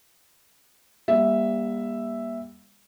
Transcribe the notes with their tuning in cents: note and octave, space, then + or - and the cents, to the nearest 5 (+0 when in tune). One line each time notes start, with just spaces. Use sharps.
G3 +30 A#3 +40 E5 +0